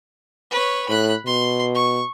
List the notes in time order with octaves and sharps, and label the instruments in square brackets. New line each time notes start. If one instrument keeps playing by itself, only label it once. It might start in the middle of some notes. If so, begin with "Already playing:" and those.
[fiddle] B4 C#5
[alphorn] A2 [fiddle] B5 F#6
[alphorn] B2 [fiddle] C6
[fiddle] C#6